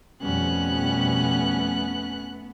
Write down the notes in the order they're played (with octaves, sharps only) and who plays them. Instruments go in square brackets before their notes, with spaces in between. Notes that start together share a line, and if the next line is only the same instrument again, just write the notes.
[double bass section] F2 B2 G3 [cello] A3 B3 [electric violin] C#4 F#6